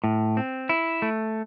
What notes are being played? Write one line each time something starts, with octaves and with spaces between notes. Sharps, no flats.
A2
C4
E4
A3